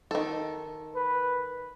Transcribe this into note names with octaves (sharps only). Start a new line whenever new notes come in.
D#3 A4
B4